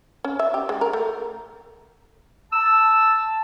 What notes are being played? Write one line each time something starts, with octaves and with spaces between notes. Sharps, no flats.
C#4
E5
G4
G#3
A#4
A3
A5 E6